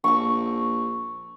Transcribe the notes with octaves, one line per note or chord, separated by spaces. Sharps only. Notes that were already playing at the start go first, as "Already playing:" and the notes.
A#1 C#6 E6